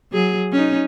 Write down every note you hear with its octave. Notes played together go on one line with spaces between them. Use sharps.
F#3 G#4
C#4 D#4